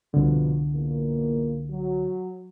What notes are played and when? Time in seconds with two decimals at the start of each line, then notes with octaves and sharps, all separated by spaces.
0.14 C2 B2 D3 F3
0.72 E2 A#2 A#3
1.70 F#3